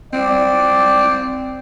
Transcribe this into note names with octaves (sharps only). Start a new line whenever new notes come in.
C4 D5